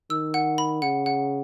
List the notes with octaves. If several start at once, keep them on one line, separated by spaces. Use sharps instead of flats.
D#3 E6
F#5
B5
C#3 F#5
F#5